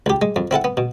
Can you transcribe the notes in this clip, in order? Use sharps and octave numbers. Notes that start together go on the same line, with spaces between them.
C#2 G4
G#3
F2
C4 E4 A4 F#5
B3
B2